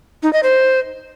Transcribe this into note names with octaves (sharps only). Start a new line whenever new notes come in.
D#4
D#5
C5